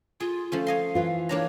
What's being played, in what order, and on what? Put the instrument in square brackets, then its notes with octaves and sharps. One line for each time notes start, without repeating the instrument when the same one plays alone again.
[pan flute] F4 [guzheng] G#4
[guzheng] F3 A3 C#4
[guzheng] C#5 D#5 C6 [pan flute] F5
[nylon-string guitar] E3 F4
[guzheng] A#3 D4 A#5 [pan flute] C#5